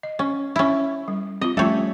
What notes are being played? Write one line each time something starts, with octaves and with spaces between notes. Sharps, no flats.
D#5
C#4
C#4 E4
G3
C4 F4 D#5
F3 G3 A3 C#4 F4 A4 C#5 E5